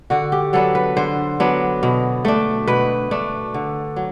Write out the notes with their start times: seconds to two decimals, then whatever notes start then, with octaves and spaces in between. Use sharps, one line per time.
0.10 D3 F#4
0.32 G4
0.53 F#3 B3 D4 A4
0.75 B4
0.97 D3 C5
1.40 F#3 B3 D4
1.83 B2
2.25 A3 D4
2.68 B2 B4
3.11 A3 D4
3.54 D3
3.96 F#3